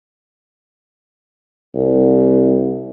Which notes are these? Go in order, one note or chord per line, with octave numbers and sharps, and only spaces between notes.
C2